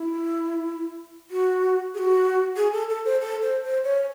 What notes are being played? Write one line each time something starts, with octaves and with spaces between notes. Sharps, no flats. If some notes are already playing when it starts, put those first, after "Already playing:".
Already playing: E4
F#4
G#4
F#4
G#4
A4
A4
C5
A4
C5
C5
C#5